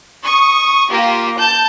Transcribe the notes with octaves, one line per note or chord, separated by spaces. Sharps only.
C#6 D#6
A#3 F4 G4
A5 G6